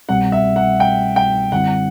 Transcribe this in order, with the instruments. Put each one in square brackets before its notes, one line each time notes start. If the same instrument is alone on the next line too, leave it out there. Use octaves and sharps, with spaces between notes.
[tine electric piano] C2 B2 G3 C4 [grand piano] F#5
[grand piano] E5
F#5
G5
G5
[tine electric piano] F#2 D3 G3 C4 E4 [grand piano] F#5